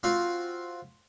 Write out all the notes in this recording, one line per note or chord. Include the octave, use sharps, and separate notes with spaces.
C4 F4 F#4